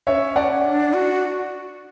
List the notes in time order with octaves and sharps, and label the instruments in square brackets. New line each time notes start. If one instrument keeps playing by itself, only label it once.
[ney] D4 [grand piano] C#5 E5
[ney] C#4
[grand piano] D5 F#5
[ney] D4
F#4